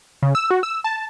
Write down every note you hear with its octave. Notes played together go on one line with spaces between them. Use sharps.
C#3
E6
F#4
E6
A5